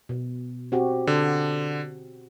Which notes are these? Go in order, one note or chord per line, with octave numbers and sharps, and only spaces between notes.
B2
C4 F#4 G4
D3